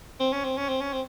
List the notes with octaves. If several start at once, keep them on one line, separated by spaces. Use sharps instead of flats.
C4
C#4
C4
C#4
C4
C#4
C4